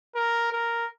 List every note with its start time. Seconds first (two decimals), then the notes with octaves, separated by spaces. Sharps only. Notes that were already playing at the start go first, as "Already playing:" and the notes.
0.15 A#4
0.53 A#4